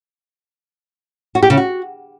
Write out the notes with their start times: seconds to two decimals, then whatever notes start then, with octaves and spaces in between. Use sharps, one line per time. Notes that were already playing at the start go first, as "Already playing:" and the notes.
1.35 F#4
1.43 G4
1.50 C#3
1.57 F#4